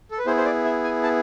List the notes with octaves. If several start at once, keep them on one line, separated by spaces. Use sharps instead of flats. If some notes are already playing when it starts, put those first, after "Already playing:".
A4
B4
B3 E4 G#4 C5
C5
D5
E5
G#5
A5